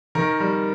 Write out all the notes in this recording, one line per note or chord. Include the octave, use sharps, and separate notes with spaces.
D#3 A#4
G3